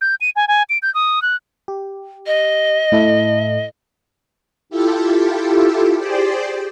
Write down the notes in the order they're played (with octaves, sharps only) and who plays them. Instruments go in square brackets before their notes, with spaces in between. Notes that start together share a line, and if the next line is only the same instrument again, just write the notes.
[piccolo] G6
D#7
G#5
G#5
D7
G6
D#6
F#6
[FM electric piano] G4
[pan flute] D#5
[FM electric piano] A2 E4 A4
[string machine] E4 F4 G4 A4
G4 G#4 C5 D5